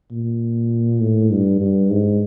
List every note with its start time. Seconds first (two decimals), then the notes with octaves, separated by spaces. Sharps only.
0.11 A#2
1.01 A2
1.31 G2
1.61 G2
1.90 G#2